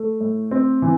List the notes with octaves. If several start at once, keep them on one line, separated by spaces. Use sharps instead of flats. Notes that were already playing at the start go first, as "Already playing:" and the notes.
Already playing: A3
A2
C4
E3